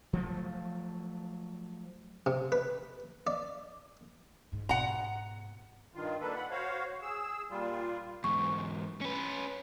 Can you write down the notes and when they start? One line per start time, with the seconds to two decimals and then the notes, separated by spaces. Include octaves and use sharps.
0.13 F3 F#3 A3
2.26 C3
2.52 B4
3.27 D5
4.52 G#2 D#3
4.69 G#2 B2 F#5 A#5
5.95 G2 D#3 F4
6.20 A#3 D4 A4 B4
6.36 F#5 B5
6.51 F#4 C5 C#5 F5
7.02 G#4 E6
7.51 A#2 G3 F4
8.24 E2 G#2 C#6
9.01 C#4 B4